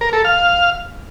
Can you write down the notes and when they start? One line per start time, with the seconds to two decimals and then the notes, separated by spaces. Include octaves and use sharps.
0.01 A#4
0.13 A4
0.25 F5